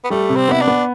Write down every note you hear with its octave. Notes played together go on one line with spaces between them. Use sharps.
B3
G3 A3
C3
C4
B3 E4
D4
B3